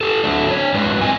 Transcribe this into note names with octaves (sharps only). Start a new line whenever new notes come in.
G4 A4
D3 F#3 A3 D4
D4 C#5
A2 F#3 G#3 D4 B4
C4 D#5 G#5